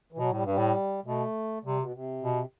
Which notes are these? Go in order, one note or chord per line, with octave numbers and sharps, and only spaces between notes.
E3
B2 F#3
A2 G3
G2 G3
A2
B2 A3
C3 G3
B2
C3
B2